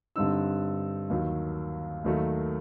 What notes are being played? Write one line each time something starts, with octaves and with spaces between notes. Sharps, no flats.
G2 D3 G3 C4 D#4 E6
D#2 D#3 F#3
D#2 D#3 F#3 A3